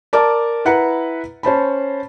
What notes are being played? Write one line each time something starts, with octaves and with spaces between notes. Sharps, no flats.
A#4 D5 A5 D6
E4 B4 F#5 A#5 C#7
C#4 C5 A5 B5